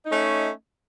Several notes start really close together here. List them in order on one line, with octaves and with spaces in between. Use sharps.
D#5 D#4 A3 C#4